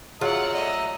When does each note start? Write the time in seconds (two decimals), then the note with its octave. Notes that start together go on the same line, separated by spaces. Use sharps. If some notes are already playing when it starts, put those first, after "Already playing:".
0.21 F#3 F4 G#4 D5 E5 F#5 A#5 E6
0.54 A3 D5 D#5